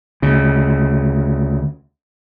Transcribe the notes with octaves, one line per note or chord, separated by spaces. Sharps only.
D2 C#3